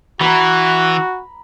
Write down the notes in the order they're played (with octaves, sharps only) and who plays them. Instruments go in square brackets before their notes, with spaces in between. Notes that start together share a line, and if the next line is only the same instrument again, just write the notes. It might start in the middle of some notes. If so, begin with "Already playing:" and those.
[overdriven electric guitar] E3 [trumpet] F#4 [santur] A#5 B5